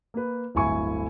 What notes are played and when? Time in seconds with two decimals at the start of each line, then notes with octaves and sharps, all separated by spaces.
0.14 A#3 B4
0.55 D1 G1 E4 G#5 C#6